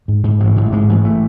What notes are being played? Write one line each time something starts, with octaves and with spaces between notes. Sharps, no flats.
G#2
G#2
A1 G#3
A1
G#2 G#3
A1
A3